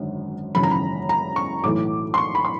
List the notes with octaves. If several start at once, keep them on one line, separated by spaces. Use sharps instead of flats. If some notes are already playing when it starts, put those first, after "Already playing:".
Already playing: G#1 F#2 D3
G#1 F#2 C#3 E3 B5
A#5
B5
A#5
C#6
B1 A2 E3 A3 D6
C6
C#6
B5
C6